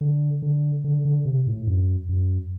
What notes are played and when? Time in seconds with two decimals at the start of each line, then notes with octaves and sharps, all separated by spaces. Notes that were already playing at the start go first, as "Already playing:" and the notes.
0.01 D3
0.42 D3
0.84 D3
1.05 D3
1.25 C3
1.47 A2
1.67 F#2
2.09 F#2